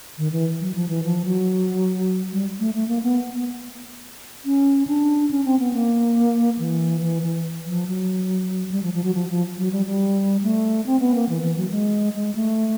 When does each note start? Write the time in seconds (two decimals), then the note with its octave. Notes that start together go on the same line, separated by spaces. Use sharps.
0.18 D#3
0.32 E3
0.61 F#3
0.75 F3
0.89 E3
1.04 F3
1.25 F#3
2.32 G3
2.60 A3
2.75 A3
2.88 A#3
3.03 B3
3.31 B3
4.45 C#4
4.87 D4
5.31 C#4
5.45 C4
5.59 B3
5.73 A#3
6.59 E3
7.02 E3
7.23 E3
7.66 F3
7.87 F#3
8.72 G3
8.83 F3
8.94 F3
9.04 F#3
9.15 F3
9.29 F3
9.58 F#3
9.72 G3
9.86 G3
10.43 A3
10.86 C4
11.00 B3
11.15 A#3
11.29 E3
11.43 E3
11.57 F#3
11.71 G#3
12.14 G#3
12.35 A3